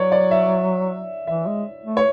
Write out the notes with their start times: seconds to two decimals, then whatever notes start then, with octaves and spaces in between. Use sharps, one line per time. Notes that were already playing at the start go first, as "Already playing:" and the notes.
Already playing: F#3 C#5 D5
0.12 D5
0.31 E5
1.27 E3 E5
1.47 G#3
1.85 A3
1.97 C#5